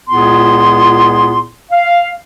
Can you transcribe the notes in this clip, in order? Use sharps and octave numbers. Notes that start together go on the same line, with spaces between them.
C#2 A#2 B3 E4 G#4 C6
F5